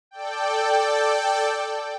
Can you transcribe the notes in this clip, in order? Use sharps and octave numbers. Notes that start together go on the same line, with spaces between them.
A4 D5 G5